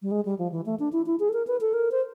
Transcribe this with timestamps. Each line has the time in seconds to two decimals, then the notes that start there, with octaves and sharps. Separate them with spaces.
0.02 G3
0.11 G#3
0.25 G3
0.39 F3
0.52 E3
0.66 A3
0.80 D4
0.93 E4
1.06 E4
1.20 G#4
1.29 A4
1.33 A#4
1.47 B4
1.61 A4
1.74 A#4
1.91 C5